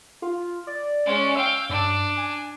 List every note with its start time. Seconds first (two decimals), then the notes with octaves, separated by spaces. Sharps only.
0.22 F4
0.67 D5
1.06 G#3 C#4
1.36 F5 G5 E6
1.70 G2 D4
2.17 G#5